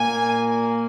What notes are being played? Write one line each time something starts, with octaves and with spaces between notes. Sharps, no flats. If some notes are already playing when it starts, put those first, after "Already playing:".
Already playing: A#2 A#3 G#5